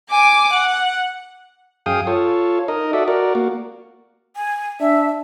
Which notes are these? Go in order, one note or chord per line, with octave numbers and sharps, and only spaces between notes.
G#5 D6
F#5
F#2 G#4 F5 G5 D#6
F4 A4 C#5
D#4 A#4 D#5
F#4 A4 D5 E5
F#4 A#4 D5
A#3 F#4
G#5
D4 E5